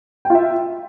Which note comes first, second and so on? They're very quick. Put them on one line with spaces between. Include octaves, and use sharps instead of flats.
G5 F4 E5